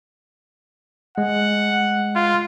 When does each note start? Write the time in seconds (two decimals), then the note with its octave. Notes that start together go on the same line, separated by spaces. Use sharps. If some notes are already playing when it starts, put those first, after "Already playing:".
1.18 G#3 F#5
2.16 F4